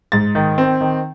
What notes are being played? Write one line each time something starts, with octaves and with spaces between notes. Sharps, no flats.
G#2 A6
D#3
C4
D#3